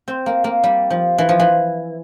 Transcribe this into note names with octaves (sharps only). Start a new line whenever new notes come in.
C4
A#3
A#3
G3
F3
E3
F3
E3